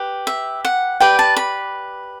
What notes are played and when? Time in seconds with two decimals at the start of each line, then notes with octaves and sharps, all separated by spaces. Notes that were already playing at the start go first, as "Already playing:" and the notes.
Already playing: G4 B4
0.27 E5
0.65 F#5
1.00 G4 B4 D5 G5
1.19 A5
1.37 B5